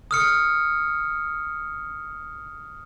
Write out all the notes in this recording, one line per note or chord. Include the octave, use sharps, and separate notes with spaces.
D#6 F6 C#7